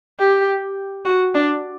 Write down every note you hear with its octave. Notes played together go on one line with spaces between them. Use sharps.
G4
F#4
D4